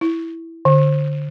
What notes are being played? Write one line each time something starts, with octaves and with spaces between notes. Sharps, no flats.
E4
D3